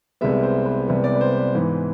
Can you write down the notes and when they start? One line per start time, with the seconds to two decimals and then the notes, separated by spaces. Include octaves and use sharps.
0.21 C2 C3 G#3 B3 E5
0.43 C5
0.66 B4
0.88 C2 C3 G#3 B3
1.04 D5
1.15 B4
1.21 C5
1.38 B4
1.54 G#2 E3 B3